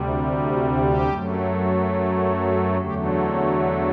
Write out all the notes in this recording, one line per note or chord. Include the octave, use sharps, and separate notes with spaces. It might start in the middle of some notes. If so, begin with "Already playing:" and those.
Already playing: D2 C3 G3
F#4
G4
F#2 F#3 A3
F#4
A4
E2 D3 F#3 A3 G4
C4